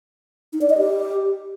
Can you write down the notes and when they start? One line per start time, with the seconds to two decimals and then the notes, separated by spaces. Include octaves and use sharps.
0.53 D#4
0.61 D5
0.70 D#5
0.78 G4